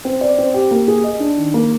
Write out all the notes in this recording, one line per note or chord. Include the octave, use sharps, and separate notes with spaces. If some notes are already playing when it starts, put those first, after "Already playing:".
C4
D5
C4
G4
A#3
G#4
D#5
D4
D#3
A#3